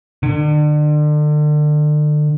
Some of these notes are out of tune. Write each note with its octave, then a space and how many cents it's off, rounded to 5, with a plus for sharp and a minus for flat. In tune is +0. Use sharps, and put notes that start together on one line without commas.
D3 +35